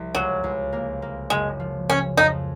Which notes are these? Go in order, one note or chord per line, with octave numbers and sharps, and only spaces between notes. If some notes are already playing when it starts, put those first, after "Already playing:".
Already playing: C2 F3
C#2 F#3
C#2
A#3
A#3
F#1 G#3
F3
C#3 C#4
F2 D#4